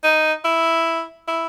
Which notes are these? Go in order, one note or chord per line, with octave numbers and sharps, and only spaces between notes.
D#4
E4
E4